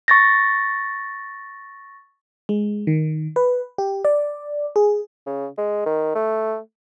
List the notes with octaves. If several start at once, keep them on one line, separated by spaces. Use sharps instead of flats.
C#6 A6 A#6
G#3
D#3
B4
G4
D5
G#4
C#3
G#3
D#3
A3